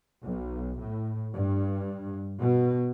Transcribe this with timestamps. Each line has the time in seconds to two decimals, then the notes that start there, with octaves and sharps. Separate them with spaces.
0.23 B1
0.79 A2
1.34 G2
2.38 B2